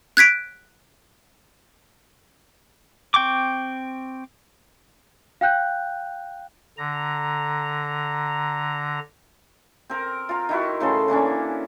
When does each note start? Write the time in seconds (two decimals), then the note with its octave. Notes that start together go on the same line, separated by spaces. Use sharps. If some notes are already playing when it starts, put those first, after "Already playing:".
0.17 F#6 G#6 B6 D7
3.14 C4 G5 C#6 D6
5.41 F5 G5 F#6 G6
6.78 D3 A#5
9.90 C4 A#4
10.29 F4 A#5
10.49 D#3 E4 F#4
10.80 A2 C#3 A4 C6
11.08 E3 A#3 C#4 D4